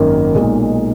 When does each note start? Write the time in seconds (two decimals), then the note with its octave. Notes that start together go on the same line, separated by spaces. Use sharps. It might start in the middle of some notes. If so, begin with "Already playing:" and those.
Already playing: G#1 F#2 D#3 A#3
0.34 B1 A#2 G#3 D#4